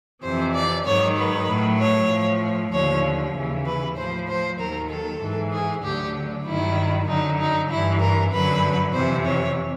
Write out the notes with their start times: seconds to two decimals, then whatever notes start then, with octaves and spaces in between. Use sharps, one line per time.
0.23 F2 C3 E3 C5
0.54 D5
0.86 G#2 D#3 F#3 C#5
1.17 B4
1.48 A2 F#3
1.79 C#5
2.10 A2 F3
2.72 D#2 D3 F3 C#5
3.35 D#2 C#3 E3
3.66 B4
3.97 A2 F3 C5
4.28 C5
4.59 D#2 D#3 F#3 A#4
4.90 A4
5.21 G#2 E3
5.52 G#4
5.83 D2 D3 F#3 G4
6.45 G2 D#3 F#3 E4
7.08 F#2 D3 F#3 D#4
7.39 D#4
7.70 G2 E3 E4
8.01 A#4
8.32 F#2 D3 F#3 B4
8.94 F2 C3 E3 C5
9.25 C#5